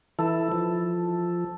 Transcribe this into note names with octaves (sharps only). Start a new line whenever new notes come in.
E3 E4 A4
F3